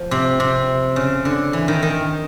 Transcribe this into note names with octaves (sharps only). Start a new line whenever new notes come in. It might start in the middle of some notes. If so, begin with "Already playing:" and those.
Already playing: F3
C3
C3
C#3
D3
E3
D#3
D#3